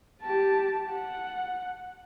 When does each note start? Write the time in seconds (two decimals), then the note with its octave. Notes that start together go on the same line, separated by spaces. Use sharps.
0.23 G4 A5
0.92 F#5